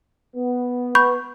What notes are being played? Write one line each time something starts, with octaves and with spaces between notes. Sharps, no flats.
B3
B5 C#6 G6